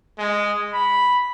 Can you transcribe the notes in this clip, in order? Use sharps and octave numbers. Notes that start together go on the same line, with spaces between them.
G#3
B5